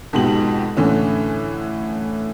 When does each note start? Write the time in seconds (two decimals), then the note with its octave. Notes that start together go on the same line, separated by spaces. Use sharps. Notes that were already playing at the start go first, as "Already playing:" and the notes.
0.13 F2 G#2 B2 G4 F#7
0.77 A2 D3 E3 C#4